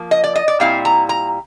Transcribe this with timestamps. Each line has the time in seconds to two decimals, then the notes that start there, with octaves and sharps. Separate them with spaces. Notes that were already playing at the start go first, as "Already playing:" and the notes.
Already playing: F3 A#3
0.11 D#5
0.24 D5
0.36 D#5
0.48 D5
0.60 A#2 G3 C4 E4 F5
0.85 A#5
1.09 A#5